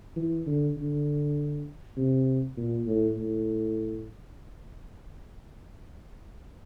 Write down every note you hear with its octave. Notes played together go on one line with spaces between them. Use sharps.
E3
D3
D3
C3
A#2
A2
A2